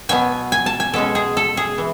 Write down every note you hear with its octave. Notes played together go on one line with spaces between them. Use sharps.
B2 F#3 B3 G#5
G#5
A5
G#5
B2 G#3 C#4 A4
G#4
A4
G#4
E3